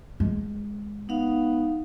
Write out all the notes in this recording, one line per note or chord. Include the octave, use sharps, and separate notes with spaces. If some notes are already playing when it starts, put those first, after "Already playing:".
G#3
B3 D#4 F5